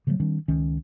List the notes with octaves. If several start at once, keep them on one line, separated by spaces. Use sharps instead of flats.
C#3 F3 F#3 A3
D#3 G3 C4 D4
C#2 D#3 C#4